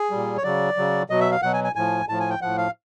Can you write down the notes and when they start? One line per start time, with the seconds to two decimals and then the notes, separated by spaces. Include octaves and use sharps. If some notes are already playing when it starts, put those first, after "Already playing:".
Already playing: G#4
0.11 A#2 G3
0.37 C#5
0.43 C#3 F#3 D5
0.77 C#3 F#3
1.10 B2 F#3 D#5
1.21 E5
1.31 F5
1.42 B2 F#3 F#5
1.53 G#5
1.64 G#5
1.76 A2 F3 G#5
2.08 A2 F3 A5
2.20 G#5
2.30 G5
2.42 A2 F3 F#5
2.58 F5